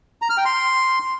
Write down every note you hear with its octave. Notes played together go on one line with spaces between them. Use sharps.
A#5
F6
G5
C6